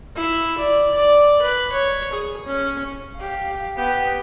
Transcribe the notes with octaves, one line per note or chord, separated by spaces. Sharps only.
E4
D5
D5
B4
C#5
G#4
C#4
G4 F5
B3 G4